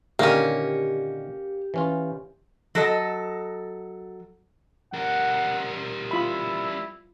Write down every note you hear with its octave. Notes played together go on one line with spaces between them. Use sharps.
A#2 D3 D#3 A#3 C#4 G4
E3 C#4 F4
F#3 A4 D#5
G3 A#4 F#5
E4 F4 B5